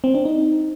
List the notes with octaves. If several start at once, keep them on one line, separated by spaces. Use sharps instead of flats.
C4
D4
D#4